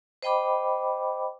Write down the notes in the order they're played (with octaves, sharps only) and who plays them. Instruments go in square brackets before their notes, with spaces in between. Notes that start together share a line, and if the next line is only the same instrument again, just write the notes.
[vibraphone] C5 D#5 G5 B5 D6